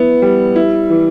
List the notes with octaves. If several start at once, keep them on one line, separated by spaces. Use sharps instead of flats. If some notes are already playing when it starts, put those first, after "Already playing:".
Already playing: B3 E4
G3
E4
E3